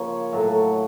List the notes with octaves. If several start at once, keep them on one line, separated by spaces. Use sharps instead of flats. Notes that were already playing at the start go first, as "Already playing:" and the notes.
Already playing: C#3 F3 A#3 C#5
A2 F#3 A3